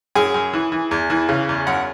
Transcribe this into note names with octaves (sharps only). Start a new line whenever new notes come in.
F#2 G#4
F#2
E3
E3
E2
E3
C#3
E2
F#2 F#5